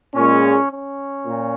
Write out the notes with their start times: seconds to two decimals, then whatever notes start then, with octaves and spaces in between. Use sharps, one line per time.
0.15 A#2 G#3 C#4
0.71 C#4
1.26 A#2